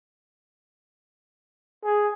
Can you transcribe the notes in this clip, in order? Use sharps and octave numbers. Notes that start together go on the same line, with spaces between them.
G#4